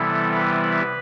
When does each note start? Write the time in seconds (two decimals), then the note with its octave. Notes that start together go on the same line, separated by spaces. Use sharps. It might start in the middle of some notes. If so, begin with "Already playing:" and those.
Already playing: C3 E3 G3 B3 E4 A4
0.35 B4